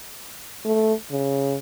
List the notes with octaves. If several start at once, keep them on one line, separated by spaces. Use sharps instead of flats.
A3
C#3